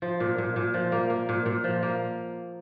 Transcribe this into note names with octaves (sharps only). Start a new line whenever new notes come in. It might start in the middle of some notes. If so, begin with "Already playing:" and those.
F3
A#2
A#2
A#2
F3
A#3
A#3
A#2
A#2
F3
A#3